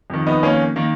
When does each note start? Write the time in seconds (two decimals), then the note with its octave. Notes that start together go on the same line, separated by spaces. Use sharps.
0.10 F2 D#3
0.27 B3 D#4
0.43 A#3 C#4
0.76 D#3 A#3